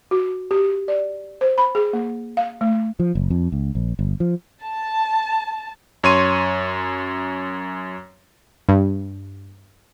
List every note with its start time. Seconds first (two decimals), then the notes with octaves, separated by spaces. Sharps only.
0.11 F#4
0.51 G4
0.88 D5
1.41 C5
1.58 B5
1.75 G#4
1.93 A#3
2.37 F5
2.61 A3
3.00 F3
3.15 F#1
3.30 F2
3.52 C#2
3.75 A#1
3.99 G1
4.20 F3
4.63 A5
6.04 F#2 C#5 C6 D#7
8.69 G2